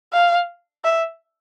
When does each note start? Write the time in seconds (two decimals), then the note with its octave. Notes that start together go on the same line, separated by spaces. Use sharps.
0.13 F5
0.85 E5